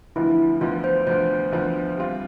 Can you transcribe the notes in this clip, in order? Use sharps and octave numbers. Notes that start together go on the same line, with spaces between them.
D2 D3 F3 B3 E4
D2 D3 F3 B3 F4
C5
D2 D3 F3 B3 C5
D2 D3 F3 B3
G3 C4 F4